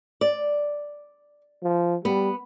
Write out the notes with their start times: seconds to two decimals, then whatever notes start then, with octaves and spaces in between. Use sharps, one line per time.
0.21 D5
1.63 F3
2.05 G3 B3